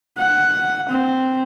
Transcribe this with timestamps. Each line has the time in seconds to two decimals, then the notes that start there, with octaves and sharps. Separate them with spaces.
0.18 F#5
0.90 C4